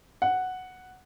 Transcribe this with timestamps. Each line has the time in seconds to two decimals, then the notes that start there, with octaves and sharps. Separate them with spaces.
0.22 F#5